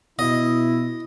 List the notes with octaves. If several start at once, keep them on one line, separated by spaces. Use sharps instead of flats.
B2 E4 D#5